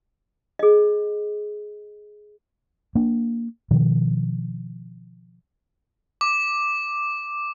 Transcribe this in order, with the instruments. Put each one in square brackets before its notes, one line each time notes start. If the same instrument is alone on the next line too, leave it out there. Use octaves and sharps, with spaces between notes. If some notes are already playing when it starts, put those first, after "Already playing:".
[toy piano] G#4 D#5
[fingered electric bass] A#3 D4
B2 D#3 F3
[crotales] D6